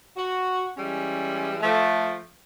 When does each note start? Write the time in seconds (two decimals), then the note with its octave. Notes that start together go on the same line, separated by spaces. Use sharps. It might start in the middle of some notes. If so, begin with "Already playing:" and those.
0.17 F#4
0.77 E3 G3 G#3 C#4
1.62 F3 A3